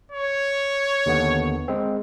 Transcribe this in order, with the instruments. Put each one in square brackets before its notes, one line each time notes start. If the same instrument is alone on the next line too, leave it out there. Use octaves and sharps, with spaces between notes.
[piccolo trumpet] C#5
[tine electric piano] D#2 D3 B3
G#3 C4